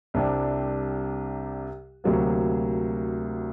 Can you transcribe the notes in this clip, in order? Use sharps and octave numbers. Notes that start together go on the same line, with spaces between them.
C2 C3 G3 D4
D2 C3 F#3 A#3